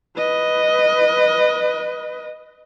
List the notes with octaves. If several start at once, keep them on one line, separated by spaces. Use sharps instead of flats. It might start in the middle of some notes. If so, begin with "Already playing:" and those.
B4 D#5